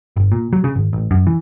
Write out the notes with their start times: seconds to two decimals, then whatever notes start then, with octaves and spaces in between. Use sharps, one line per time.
0.16 G1
0.32 A#2
0.53 F#3
0.64 C#3
0.76 G#1
0.93 A1
1.11 F#2
1.27 E3